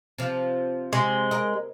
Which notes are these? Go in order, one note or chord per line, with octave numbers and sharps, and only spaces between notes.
C3 F3
C3 G#3
A#4 D#5